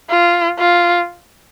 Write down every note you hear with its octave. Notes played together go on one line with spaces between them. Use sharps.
F4
F4